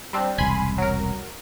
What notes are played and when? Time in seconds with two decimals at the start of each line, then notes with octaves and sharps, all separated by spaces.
0.13 G3 C4 D4
0.38 E1 C2 G#5 B5 C6
0.78 F#3 A#4